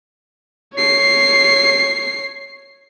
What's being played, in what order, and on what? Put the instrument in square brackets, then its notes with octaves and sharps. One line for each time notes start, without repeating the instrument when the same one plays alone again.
[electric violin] C#5 C7